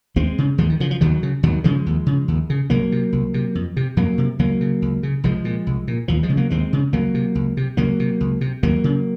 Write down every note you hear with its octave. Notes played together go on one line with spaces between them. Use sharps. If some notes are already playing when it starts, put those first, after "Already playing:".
D#2 G#3 C4
C#3
D#2 F3 G#3
D#3
C#3 F3
F3
D#2 D#3 F#3
C#3
D#2 D#3 F#3
C#3 F3 G#3
D#2
C#3
D#2
C#3
C2 F#3 A#3
C3
C2
C3
F2
C3
F2 F#3 A#3
C3
C#2 F#3 A#3
C#3
C#2
C#3
C2 F3 G#3
A#2
C2
A#2
D#2 F3
F3 G#3
C#3
F#3 A#3
D#2 G#3 C4
C#3
C#2 F#3 A#3
C3
C#2
C3
C#2 F#3 A#3
C3
C#2
C3
D#2 F#3 A#3
C#3